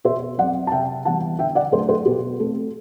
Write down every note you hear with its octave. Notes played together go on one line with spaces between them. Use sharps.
B2 C5 E5
F#3 C4 D5 F#5
A5
C3 E5 G5
E3 G3 B3 F#5 A5
D3 E5 G5
D5 F#5
F#3 A3 D4 A4 C5
A4 C5
B2 G4 B4
A3 C4 A4